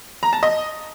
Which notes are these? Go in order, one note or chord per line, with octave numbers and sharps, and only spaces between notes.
A#5
A5
D#5